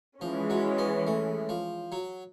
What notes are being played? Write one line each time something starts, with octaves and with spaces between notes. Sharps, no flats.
E3 F3 G#3 C#4
F#3
B3
A3
F3
F#3